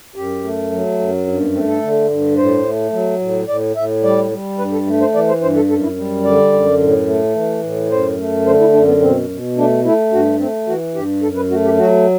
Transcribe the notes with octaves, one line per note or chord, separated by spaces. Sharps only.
F#2 G4
A3
F#3
F#2
G2
B3
A3 C4
A4
D3
G2
A2 C5
A3
F#3
A2
A2 D5
A2 E5
G3 D5
G3
G2 B4
A4
A3
C5
E3 D5
C5
G2 C5
A4
F#2 A4
E4
G3
D3 D5
F#2
A2
A3
E3
A2
F#2 C5
A3
D3 C5
E4
F#2 D4
B3
B2 C4
B2
A3 D4
A3 E4
G2 F#4
A3 C4
E3 F#4
G2 G4
F#2 A4
B4
A3 F#4
G4
F#3 F#4